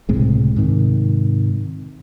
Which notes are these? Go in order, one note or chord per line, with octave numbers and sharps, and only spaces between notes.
C#2 A2 C3 G#3
G#2 C3 D#3